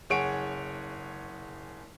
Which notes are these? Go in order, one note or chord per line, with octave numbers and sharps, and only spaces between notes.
F#1 G#4 C#5 F#5 D7